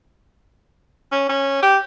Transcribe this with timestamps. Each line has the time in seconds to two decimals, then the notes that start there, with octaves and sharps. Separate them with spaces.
1.12 C#4
1.29 C#4
1.63 G4